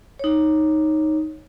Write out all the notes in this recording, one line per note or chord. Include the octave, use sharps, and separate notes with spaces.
D#4 C#5